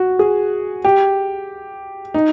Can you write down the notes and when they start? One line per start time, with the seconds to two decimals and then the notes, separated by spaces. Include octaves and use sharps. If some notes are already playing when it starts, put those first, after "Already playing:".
Already playing: F#4
0.19 G#4
0.85 G4
2.14 D#4